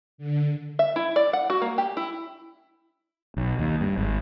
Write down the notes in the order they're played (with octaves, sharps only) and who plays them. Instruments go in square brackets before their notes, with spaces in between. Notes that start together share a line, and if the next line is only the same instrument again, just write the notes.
[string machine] D3
[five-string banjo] E5
E4
D5
F#5
F#4
A#3
G4
E4
[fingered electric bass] B1
D#2
G2
G#1